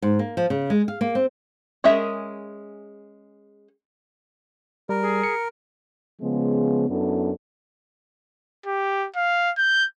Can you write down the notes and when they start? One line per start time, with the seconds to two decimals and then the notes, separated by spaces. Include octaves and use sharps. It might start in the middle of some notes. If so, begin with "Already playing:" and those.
0.02 G#2
0.19 A#3
0.37 F3
0.50 C#3
0.70 G#3
0.88 F5
1.01 A#3
1.15 C4
1.84 G#3 C#4 G#4 A#4 E5
4.89 G3 A#4
5.02 G#4
5.23 C#7
6.21 C#3 F3 G#3 B3
6.89 F#2 B3 D4 E4 A4
8.66 G4
9.16 F5
9.58 G6